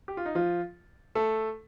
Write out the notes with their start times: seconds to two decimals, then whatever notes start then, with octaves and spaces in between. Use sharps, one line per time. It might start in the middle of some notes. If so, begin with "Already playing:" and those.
0.08 G4
0.17 F4
0.26 D#4
0.35 F3 F4
1.15 A3 A4